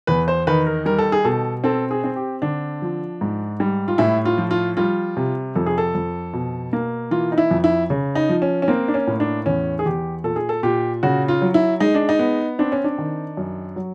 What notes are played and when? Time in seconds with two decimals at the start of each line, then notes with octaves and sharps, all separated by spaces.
0.07 E2 B4
0.28 C5
0.47 D#3 B4
0.66 A#4
0.86 G3 A#4
0.98 A4
1.12 G#4
1.25 B2 A4
1.64 C4 A4
1.91 G#4
2.04 C4
2.16 G4
2.42 D3 D4
2.82 F3
3.21 G#2
3.60 G3
3.88 F4
3.98 A2 E4
4.25 F4
4.38 F3
4.51 F4
4.77 G3 F4
5.17 C3
5.55 F2 A4
5.66 G#4
5.78 A4
5.95 F2
6.33 B2
6.73 A#3
7.11 E3 F4
7.32 D#4
7.38 E4
7.51 F2
7.64 E4
7.90 C#3
8.15 D#4
8.29 F3
8.42 C#4
8.62 C#4
8.68 A#3 C4
8.88 D4
8.94 C#4
9.07 A2
9.20 D4
9.46 E2 C#4
9.79 G#4
9.86 E2 G4
10.24 A#2 A4
10.36 G#4
10.49 A4
10.63 A#2 G4
11.03 C#3 F#4
11.28 F4
11.42 F#3
11.54 E4
11.80 G#3 D#4
11.95 D4
12.09 D#4
12.19 B3
12.59 C4 D4
12.72 C#4
12.84 D4
12.98 D#3
13.37 F#2
13.76 F#3